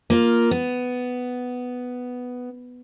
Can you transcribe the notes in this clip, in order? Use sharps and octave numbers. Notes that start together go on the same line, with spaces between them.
A#3 F4 A#4
B3